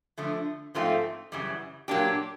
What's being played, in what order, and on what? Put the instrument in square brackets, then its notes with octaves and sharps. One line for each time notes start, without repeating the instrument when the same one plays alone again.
[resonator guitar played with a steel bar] D3 F3 A3
G#2 F3 A3 C4 F4
F#2 C#3 E3 G3
A#2 F#3 A#3 D4 G4